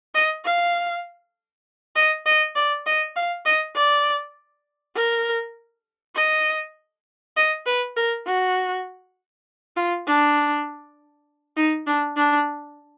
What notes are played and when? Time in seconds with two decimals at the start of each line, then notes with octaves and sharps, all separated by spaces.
0.15 D#5
0.45 F5
1.96 D#5
2.26 D#5
2.56 D5
2.86 D#5
3.16 F5
3.46 D#5
3.76 D5
4.96 A#4
6.16 D#5
7.37 D#5
7.66 B4
7.96 A#4
8.27 F#4
9.76 F4
10.07 D4
11.57 D#4
11.87 D4
12.17 D4